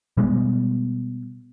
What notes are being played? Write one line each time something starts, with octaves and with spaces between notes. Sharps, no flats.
B2 G3 G#3 B3